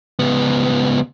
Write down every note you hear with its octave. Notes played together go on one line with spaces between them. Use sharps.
C#2 B3